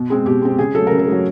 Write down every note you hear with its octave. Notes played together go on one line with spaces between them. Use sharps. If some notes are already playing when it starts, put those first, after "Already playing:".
Already playing: B2
G#3 C4
B2 G4
G#3 C4
C#3 G#4
F#3 A3 A4
C#3 A#4
A4
F#3 A3